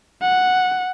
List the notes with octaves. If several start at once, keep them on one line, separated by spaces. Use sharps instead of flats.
F#5